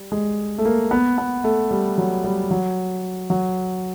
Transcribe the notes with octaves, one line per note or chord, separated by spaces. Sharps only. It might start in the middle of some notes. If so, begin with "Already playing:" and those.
Already playing: G3
G#3
A3
A#3
B3
B3
A3
G3
F#3
G3
F#3
F#3